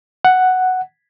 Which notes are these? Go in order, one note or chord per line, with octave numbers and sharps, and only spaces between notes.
F#5